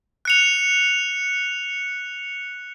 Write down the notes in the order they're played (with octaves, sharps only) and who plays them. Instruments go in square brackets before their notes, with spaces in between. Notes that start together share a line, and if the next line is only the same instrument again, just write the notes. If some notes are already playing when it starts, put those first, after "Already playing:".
[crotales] F#6 C#7 F7